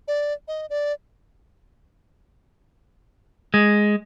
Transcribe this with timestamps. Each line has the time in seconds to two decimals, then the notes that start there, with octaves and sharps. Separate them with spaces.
0.08 D5
0.48 D#5
0.70 D5
3.54 G#3